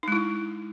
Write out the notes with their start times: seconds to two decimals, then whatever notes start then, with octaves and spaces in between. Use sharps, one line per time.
0.03 D#4
0.08 G#3
0.12 E4